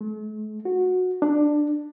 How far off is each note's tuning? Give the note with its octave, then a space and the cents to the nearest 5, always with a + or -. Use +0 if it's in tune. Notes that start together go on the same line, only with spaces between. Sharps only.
A3 -45
F#4 -15
D4 +10